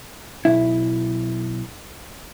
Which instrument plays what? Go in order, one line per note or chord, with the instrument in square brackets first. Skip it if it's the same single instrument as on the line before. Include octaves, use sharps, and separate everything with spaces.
[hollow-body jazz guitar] B1 E4